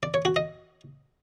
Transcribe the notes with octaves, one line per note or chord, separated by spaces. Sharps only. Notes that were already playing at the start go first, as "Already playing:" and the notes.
D5
C#5
F#4
D#5